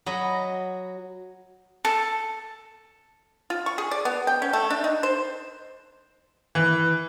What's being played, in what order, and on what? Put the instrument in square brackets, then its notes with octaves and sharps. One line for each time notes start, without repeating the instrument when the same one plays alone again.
[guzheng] F#3 D#5 B5
[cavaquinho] A4
[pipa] F4
C#6
G#4
D5
B3
G5
C#4
A3
D4
D#4
C5
[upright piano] E3